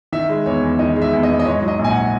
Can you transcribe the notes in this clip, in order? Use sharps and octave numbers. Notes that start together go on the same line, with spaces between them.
D#3 E5
G#3
E2 C#5
E2
D#3 D#5
G#3
E5
E2
D#5
E2
D#5
G#2 C#5
F#3
D#5
A#1
G#5
F#5